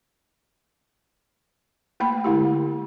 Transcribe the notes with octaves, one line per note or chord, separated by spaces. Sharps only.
A3 A#3 G5 B5
D3 G#3 E4 G4